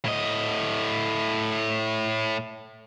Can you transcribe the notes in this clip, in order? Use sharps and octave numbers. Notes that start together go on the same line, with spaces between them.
A2 D#5